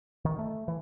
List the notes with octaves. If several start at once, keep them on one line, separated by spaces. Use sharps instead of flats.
D#3
A3
E3